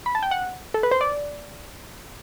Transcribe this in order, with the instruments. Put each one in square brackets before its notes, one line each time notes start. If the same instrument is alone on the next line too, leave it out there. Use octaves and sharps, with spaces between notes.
[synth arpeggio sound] B5
A5
G5
F#5
A4
B4
C5
D5